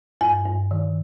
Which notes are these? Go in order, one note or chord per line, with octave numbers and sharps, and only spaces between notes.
G2 G#5
G2
D#3